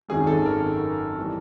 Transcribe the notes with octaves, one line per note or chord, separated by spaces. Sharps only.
G#1 F#2 D#3 F#3 G#4
A4
A#4
E3 G3